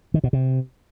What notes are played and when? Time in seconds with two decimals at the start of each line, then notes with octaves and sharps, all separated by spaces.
0.14 D#3
0.24 B2
0.33 C3